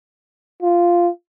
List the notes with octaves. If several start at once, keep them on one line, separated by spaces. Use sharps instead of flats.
F4